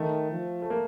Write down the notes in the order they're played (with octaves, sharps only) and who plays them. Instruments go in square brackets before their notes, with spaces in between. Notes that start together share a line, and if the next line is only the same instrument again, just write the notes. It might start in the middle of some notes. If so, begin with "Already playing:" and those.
Already playing: [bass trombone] D#3 [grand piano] A3
[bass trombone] F3
[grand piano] A3
A#3